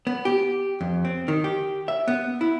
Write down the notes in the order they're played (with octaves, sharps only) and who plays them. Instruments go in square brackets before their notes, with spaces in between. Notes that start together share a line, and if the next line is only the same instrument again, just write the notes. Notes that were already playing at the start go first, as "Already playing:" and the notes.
[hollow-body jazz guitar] B3
G4
F2
C4
D#3
G4
E5
B3
E4